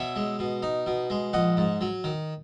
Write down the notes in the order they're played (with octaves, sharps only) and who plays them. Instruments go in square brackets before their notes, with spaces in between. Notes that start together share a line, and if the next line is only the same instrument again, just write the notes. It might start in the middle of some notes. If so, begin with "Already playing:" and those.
Already playing: [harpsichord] B2 C#5 E5
G#3
B2
D#4
B2
G#3
A#1 D#5 F#5
G#2
F#3
D#3